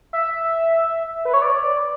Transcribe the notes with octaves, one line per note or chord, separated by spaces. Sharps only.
E5
B4
C#5
D5
D5